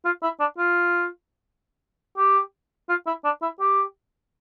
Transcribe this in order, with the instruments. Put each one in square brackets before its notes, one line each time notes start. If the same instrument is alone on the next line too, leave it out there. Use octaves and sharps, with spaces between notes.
[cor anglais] F4
E4
D4
F4
G4
F4
E4
D4
E4
G4